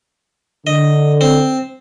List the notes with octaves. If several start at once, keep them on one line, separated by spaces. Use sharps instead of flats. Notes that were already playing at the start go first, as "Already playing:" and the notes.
D3 D#5
C4